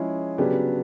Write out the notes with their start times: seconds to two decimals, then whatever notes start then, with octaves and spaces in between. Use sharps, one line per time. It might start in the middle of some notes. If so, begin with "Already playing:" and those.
Already playing: F3 G#3 C#4 E4 G#4
0.38 C#3 F#3 B3 D4 G4